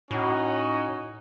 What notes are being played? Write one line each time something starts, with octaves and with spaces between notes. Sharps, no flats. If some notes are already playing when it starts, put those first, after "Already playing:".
A2 C#4 D#4 F#4